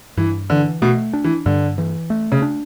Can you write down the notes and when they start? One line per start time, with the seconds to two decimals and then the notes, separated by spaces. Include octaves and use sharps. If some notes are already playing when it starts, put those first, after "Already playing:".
0.17 G2 E3
0.50 D3 E3
0.82 B2 A3
1.13 D4
1.24 E3
1.46 G2 D3
1.78 E3
2.10 A3
2.32 C#3
2.42 D4